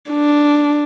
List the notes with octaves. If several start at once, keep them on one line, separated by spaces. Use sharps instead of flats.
D4